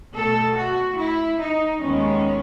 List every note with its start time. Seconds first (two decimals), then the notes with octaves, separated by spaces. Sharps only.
0.14 B2 A3 A4
0.56 F#4
0.98 E4
1.40 D#4
1.82 D#2 D#3 G#3 B3 C#4